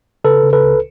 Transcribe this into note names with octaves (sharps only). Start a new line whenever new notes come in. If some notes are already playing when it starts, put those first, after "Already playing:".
C#3 A4 B4
C#3
A4 B4
C#2